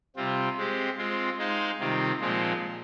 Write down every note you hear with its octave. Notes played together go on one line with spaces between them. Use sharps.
C3 G3 C4 F4
G#3 C4 G4
G#3 C4 F4
G#3 D#4 G#4 C5 F5
C3 D#3 G3 C4 F4
A#2 F3 G#3 C4 F4